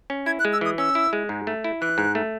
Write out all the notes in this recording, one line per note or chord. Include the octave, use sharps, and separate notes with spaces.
C#4
E4 G#6
F#6
G#3
E6
E3 D#6
C#4 E6
E4
G#3
G#2
A3
E4
E3 F#6
G#2
A3